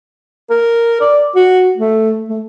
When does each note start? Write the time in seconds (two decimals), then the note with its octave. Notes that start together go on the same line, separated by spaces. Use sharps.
0.50 A#4
1.01 D5
1.35 F#4
1.77 A3
2.29 A3